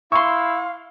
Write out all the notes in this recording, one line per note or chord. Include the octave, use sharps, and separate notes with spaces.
E4 E5 F5 C6 C#6